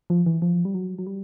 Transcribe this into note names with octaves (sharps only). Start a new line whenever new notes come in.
F3
E3
F3
G3
F#3
F#3
G3